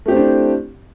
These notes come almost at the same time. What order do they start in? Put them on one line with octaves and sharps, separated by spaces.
A3 G4 C4 E4 D4